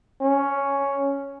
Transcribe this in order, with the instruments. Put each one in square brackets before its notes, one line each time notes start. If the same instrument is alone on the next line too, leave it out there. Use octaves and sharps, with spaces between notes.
[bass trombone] C#4